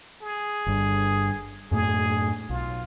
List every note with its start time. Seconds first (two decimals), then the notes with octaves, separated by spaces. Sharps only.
0.22 G#4
0.66 G1 G2
1.71 F#2 A2 A3 G#4
2.50 B1 F4